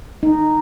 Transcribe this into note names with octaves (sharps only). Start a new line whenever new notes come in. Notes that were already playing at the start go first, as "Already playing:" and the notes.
D#4